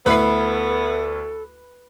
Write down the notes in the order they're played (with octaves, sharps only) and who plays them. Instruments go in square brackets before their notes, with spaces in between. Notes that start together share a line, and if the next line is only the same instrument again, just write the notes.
[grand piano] D2 E4 C7 [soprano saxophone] B3 [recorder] A4 [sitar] B4